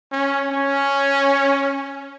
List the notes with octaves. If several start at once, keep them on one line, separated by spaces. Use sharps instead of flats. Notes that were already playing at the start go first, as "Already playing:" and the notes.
C#4
C#4